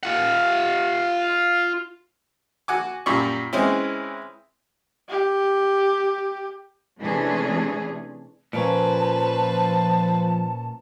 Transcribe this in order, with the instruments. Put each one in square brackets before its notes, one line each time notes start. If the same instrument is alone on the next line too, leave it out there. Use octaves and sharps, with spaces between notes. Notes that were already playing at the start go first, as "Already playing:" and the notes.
[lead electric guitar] F4 F#5
[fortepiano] F#4 F#5 G#5 D6
F#2 A#2 G3 D5 C#6
E3 G#3 C4 C#4 E4
[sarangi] G4
[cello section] C3 E3 A3 C#4 D4 G#4
[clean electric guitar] A#2 A#3 C#4 [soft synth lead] F3 [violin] B4 C5 [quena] A5